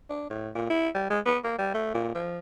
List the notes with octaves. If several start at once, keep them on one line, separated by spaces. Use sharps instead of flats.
D4
A2
A#2
E4
G3
G#3
B3
A#3
G3
A3
A#2
F3